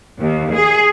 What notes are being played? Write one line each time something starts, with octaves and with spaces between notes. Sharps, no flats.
D#2
G#4